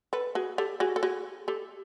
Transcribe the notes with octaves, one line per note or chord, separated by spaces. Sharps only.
A4 B4
F#4 G#4
G4 A4
F#4 G#4
A4
F#4 G#4
G4 A4